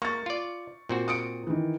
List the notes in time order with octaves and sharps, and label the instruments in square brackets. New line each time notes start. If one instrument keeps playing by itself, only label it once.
[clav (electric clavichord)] A#3 [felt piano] C#6 A6
[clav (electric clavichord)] F4 D5
A#2 C4 F#4
[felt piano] D#6 C#7 D7
D#3 E3